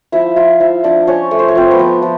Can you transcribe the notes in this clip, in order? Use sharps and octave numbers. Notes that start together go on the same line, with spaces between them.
F3 E4 E5
F3 F4 F5
F3 E4 E5
F3 D4 D5
F3 C#4 C#5
A3
C5
C#5
F3 C4 C5
B3 B4
F3
F3